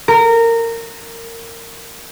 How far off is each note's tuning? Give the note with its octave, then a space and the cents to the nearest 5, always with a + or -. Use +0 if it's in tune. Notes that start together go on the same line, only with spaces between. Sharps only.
A#4 -20